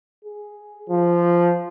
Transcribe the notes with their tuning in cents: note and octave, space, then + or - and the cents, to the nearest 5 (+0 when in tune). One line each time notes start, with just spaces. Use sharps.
G#4 +0
F3 -10